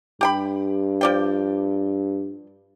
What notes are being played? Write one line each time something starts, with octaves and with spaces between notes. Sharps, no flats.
G2 G4 G5 B5
F3 D5 G5